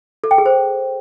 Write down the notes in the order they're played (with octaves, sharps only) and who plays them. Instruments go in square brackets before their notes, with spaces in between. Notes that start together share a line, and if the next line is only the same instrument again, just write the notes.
[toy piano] A4
G5
G#4
C5